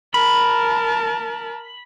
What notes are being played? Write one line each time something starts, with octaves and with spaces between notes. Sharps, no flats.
A#4 A5 B5